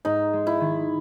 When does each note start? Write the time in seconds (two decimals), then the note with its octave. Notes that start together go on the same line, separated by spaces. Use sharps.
0.05 G#2 D#4
0.33 G#3
0.47 E4
0.60 D#3